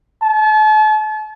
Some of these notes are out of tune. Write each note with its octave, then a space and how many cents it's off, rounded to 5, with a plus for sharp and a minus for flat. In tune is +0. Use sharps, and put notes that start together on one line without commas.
A5 -40